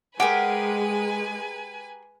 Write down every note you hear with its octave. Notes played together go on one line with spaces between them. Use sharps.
G#3 G4 G#4 A#4 B4 F#5 G#5